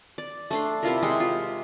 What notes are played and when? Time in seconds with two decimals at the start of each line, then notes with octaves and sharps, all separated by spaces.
0.18 D5
0.51 A3 D4 C6
0.83 C3 E4 F4 A#4
1.03 C3 G#3 G5
1.20 F4